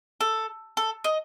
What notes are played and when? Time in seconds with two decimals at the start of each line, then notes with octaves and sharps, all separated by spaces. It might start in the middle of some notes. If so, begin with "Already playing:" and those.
0.21 A4
0.77 A4
1.04 D#5